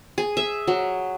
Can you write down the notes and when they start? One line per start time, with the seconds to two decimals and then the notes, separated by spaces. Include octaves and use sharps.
0.18 G#4
0.37 E5
0.67 F#3